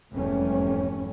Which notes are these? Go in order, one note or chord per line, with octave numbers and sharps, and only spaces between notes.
F1 E2 G#2 G3 A3 C#4